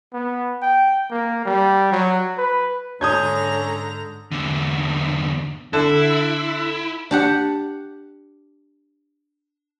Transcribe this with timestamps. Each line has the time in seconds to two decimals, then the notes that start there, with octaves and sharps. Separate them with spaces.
0.14 B3
0.62 G5
1.11 A#3
1.45 G3
1.92 F#3
2.38 B4
3.01 G#2 D3 C#4 A#5 D#6 G6 G#6
4.32 E2 D3
5.73 D3 E4
7.11 D4 G4 F#5